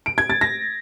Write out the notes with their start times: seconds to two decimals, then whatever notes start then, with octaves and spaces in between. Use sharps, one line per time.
0.06 D7
0.18 G#6
0.30 A6
0.41 A#6